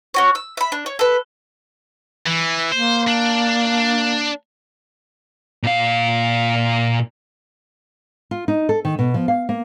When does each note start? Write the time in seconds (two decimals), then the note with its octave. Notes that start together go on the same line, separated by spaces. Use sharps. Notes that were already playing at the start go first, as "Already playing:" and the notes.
0.14 C#4 F#4 C#5
0.35 E6
0.57 E5 B5
0.72 D4
0.86 C#5
0.99 A4 B4
2.26 E3
2.72 A#3 C5
3.08 D4
5.63 A#2 F5
8.31 F4
8.48 D#4
8.69 A4
8.85 D#3
8.99 B2
9.14 F3
9.28 F5
9.49 A#3